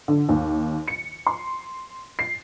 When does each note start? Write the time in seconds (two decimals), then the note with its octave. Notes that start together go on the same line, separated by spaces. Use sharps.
0.08 D3
0.29 D#2
0.88 C#7
1.27 C6
2.19 C7